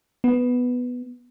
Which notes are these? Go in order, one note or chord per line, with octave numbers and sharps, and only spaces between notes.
B3